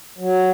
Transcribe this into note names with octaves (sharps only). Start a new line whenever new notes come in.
F#3